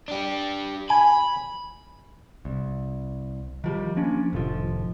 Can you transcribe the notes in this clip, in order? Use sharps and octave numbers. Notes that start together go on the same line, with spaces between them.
D4 G4
G#5 B5
C2
D#3 F3 G3
F3 A#3 C#4 D4
F1 A2 D#3 F3